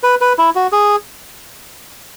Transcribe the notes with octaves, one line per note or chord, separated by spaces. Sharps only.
B4
B4
E4
F#4
G#4